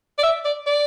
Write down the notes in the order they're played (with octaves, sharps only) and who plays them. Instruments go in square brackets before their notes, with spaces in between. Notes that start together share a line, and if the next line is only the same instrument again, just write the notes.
[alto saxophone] D5
E5
D5
D5